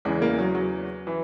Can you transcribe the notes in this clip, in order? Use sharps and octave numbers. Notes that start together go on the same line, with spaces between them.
E2 C#3 E3 G#3
A#3
F#3
F#3
E3